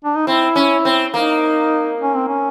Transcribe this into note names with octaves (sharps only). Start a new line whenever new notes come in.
D4
D#4
C4 E4
C#4
C4
A#3 D#4
C#4
C4
C#4